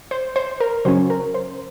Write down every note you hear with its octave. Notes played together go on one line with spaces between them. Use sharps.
C5
C5
A#4
C#3 F#3 C#4 C5
A#4
C5